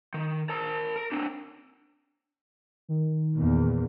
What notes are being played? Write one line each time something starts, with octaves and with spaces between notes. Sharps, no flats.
D#3
A#4 A5
A#4
C4 D4
D#3
E2 A#2